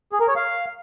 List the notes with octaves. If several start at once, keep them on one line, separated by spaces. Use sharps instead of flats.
G#4
A#4
C#5
F5